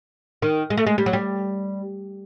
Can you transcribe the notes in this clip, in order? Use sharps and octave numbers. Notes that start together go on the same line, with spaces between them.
D#3
G#3
A3
G#3
G3
F#3
G3